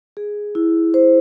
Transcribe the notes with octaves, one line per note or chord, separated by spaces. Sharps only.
G#4
E4
C5